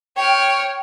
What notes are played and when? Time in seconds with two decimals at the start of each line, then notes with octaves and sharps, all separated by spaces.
0.17 C#5 G5 F6